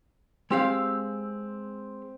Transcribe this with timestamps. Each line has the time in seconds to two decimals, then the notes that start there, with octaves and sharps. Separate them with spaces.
0.51 G#3 C4 G4 F5